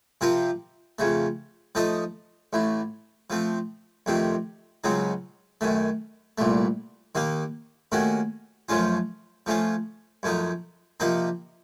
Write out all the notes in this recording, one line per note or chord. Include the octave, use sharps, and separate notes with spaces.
C3 F3 C4 F4 A#4
F2 C#3 A3
F3 A3 D#4 A4 D#5
A1 A2 A3
F3 A3 C4
F2 C3 D#3 A3 C4
C#2 C#3 F#3 C4 D#4
F#2 D#3 A3
C2 A#2 A3
D#2 D#3 A#3 D#4
D#2 D#3 A3 C#4 F#4
F#2 F3 A3 C#4 F4
F3 A3 C#4 F4
F#2 F3 A3 D#4
C3 F3 A#3 D#4 A#4